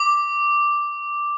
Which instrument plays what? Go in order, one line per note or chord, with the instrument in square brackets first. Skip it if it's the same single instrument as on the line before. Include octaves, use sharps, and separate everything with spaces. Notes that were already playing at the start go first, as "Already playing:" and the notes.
Already playing: [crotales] D6